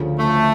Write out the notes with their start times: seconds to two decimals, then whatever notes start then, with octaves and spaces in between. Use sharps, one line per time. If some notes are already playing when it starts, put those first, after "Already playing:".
Already playing: D2 C#3 F3
0.19 A3